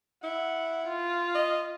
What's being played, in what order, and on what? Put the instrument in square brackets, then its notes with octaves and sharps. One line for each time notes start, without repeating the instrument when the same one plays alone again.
[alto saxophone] E4 [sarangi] F#5
[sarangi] F4
[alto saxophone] D#5